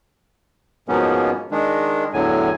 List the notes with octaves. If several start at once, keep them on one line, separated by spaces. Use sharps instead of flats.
G#2 B2 F3 A#3 B3 C#4
D#3 G#3 D4
E2 A2 D3 F#3 G#5